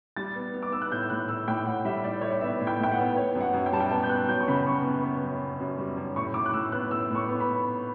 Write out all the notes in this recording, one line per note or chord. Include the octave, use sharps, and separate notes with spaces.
G3 A6
B3
B3
D6
B3 E6
F#6
A2 G6
E6
A2 F#6
A2 E6
A2 G5
A2 F#5
G3 E5
A2 D5
A2 C#5
D5
B3 E5
A2
G5
A2
G5
F#5
B3
B3 C#5
F#2
F#5
F#2
G5
G3 A5
G5
B3 A5
G6
B3 F#6
F#2 G6
C#6
C#3 B5
B3 C#6
B3
B3
F#2
B3
F#2
G3
F#2
A2 C#6
A2 D6
F#6
A2 E6
B3 F#6
A2 E6
A2
C#6
B3
B5